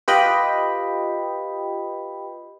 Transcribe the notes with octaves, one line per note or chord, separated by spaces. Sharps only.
F4 G4 B4 D#5 G5 B5